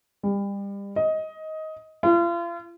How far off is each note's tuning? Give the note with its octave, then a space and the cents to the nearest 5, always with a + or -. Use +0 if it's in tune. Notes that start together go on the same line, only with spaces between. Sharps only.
G3 +30
D#5 +15
F4 -35